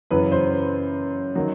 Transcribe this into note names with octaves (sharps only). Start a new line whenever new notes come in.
F#2 C#3 E3 B4
C5
D#3 F#3